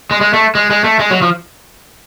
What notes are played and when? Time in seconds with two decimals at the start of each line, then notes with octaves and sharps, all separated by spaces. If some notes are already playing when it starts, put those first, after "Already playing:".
0.11 G#3
0.21 G#3
0.33 A3
0.55 G#3
0.71 G#3
0.84 A3
0.99 G#3
1.10 F#3
1.22 F3